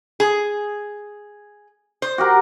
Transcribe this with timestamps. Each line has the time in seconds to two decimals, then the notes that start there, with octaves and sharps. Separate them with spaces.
0.20 G#4
2.02 C5
2.18 F#4 G4 A#4